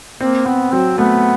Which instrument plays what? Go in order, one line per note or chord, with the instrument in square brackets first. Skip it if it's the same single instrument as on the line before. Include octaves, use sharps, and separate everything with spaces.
[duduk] A#3 [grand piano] C4
[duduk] B3 [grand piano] C4
[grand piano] F#3 [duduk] C4
[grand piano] A3 [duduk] B3